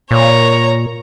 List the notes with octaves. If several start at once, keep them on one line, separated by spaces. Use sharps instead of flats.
A#2 C#5 A#5